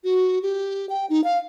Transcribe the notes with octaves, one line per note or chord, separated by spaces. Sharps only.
F#4
G4
G5
D#4
F5